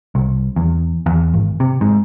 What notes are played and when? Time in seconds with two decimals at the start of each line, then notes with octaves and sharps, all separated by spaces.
0.15 C2
0.56 E2
1.06 E2
1.34 G#1
1.60 C3
1.81 G#2